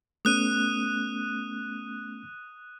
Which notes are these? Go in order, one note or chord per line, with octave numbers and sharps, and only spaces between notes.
A3 B3 C#4 D#6 F#6 D#7